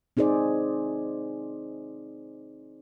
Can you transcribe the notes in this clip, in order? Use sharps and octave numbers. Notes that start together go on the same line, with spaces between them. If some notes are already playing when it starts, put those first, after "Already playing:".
C4 D#4 G#4 C5 D5